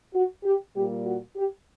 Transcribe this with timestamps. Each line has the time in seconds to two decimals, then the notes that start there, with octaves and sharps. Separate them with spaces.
0.13 F#4
0.44 G4
0.74 A#2 G3 A#3 G4
1.05 F#4
1.36 G4